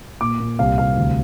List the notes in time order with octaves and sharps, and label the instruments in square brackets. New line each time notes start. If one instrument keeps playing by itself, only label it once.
[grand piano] A#2 D6
A#2
C2 F5
C2 F5
D2